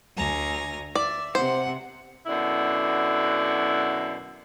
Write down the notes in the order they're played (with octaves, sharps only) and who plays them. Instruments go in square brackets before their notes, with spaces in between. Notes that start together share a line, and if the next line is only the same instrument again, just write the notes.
[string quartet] D2 G#5 A#5
[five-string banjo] D5 [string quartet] E5
[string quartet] C3 F#5 [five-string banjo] C5
[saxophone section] F#2 B2 D3 E4